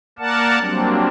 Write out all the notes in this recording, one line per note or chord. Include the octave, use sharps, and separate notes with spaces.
A#3 A#4 D5 F#5 A5
F#3 G3 A#3 C4 D4